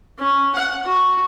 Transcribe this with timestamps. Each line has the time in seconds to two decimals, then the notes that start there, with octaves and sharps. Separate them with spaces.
0.18 C#4
0.54 F#5
0.85 F#4